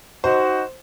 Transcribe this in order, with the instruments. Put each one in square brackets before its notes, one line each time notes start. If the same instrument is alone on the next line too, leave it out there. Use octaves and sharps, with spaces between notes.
[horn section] D#4 F#4 [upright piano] C5